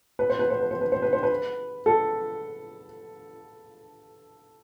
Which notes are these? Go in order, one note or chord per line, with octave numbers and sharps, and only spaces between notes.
B4
C5
B4
C5
B4
C5
B4
C5
B4
C5
B4
A4